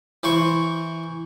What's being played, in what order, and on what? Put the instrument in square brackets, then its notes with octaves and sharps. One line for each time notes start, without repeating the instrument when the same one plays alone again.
[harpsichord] E3 C5 C#6